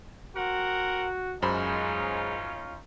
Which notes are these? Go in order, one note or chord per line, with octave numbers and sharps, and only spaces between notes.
C4 F#4 A#4 F#5
F#2 G#3 C#4 D#4 F4 C5 B5